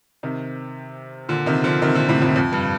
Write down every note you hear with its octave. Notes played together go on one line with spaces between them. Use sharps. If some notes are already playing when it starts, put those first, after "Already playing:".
C3 D#3
A#2 D3
C3 D#3
D3 F3
C3 D#3
A#2 D3
A2 C3
F2 A2
F2
G2